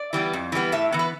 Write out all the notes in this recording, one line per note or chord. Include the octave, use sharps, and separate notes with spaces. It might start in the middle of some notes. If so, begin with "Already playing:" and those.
Already playing: D5
E3 G3 B3
F2
E3 G3 B3
A2 E5
E3 B3
B4